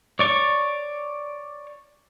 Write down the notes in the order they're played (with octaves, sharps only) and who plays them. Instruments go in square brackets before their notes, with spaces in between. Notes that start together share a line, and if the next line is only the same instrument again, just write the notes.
[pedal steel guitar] C#5 D5 C#6